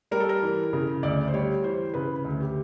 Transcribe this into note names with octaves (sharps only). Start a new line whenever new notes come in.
G3 A#4
A4
A#4
E3
C#3
D2 D5
C5
G3 C#5
E3 C5
C#3 B4
D2
G4